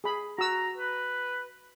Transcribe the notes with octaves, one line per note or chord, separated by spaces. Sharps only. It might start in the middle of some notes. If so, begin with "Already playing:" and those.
G#4 B5
F#4 A#5 E6
B4